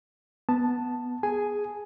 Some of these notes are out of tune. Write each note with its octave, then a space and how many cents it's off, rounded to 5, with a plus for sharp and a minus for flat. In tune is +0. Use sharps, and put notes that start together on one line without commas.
B3 -5 A5 +0
G#4 +0 G#5 +5